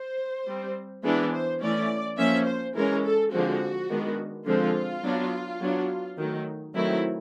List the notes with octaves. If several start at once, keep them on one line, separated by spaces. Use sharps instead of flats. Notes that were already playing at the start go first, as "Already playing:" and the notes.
Already playing: C5
G3 C4
E3 G#3 B3 D4 B4
C5
E3 A3 C#4 D5
F3 A#3 C#4 E5
C5
E3 G#3 C#4 A#4
A4
D3 F3 G#3 C4 F#4
D#3 G#3 B3 D4
D3 F3 G#3 C4 F4
F#3 B3 D4
F#3 B3 D4
D#3 F#3 A3
D#3 F#3 A3 C4 E4